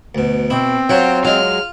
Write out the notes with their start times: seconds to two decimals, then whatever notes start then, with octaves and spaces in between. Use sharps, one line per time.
0.15 D2 B2
0.50 B2 C4 E4
0.89 F#3 F4 C5 C#5 F#5 G5
1.25 F#3 G#3 F4 F6